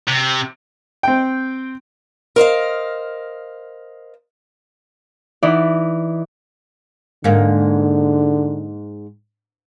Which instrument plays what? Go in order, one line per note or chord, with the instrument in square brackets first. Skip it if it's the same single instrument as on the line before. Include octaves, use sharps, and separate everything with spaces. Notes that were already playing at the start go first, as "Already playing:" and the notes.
[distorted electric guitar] C3
[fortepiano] C4 G5
[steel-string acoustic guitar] A#4 C5 D#5 F5
[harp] E3 D#4 E4 D5
[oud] G#2 A#3 [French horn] D3